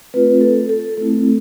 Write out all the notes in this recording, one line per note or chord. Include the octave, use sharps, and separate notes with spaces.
A3 C4 F4 B4
A4
A4
A3 C4 E4 A4